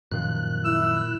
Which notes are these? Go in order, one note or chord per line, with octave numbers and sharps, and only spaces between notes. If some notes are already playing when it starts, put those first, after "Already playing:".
F#2 A#2 D#3 F3 F#6
E4 E6